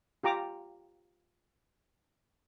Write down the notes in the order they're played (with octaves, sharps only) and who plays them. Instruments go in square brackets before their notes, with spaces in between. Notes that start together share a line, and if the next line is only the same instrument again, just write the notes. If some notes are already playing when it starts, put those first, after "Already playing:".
[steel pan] F4 G4 A#5 D6